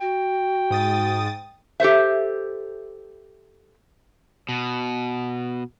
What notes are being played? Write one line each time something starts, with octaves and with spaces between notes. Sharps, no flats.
F#4 G5
G#2 D#6 A6
G4 A4 C5 E5
B2